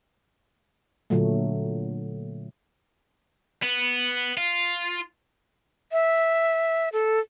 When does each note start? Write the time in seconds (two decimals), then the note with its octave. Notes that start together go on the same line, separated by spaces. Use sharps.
1.10 A#2 D3 F#3 A3
3.63 B3
4.37 F4
5.92 E5
6.93 A4